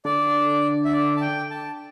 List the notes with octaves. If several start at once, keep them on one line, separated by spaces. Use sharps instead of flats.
D3 D5
E5
D5
A5
G5
A5